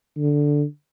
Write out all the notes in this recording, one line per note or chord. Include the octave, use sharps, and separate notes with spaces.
D3